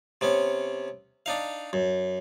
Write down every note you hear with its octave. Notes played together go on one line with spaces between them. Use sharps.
C3 B3 C#4
D4 D#4 F5
F#2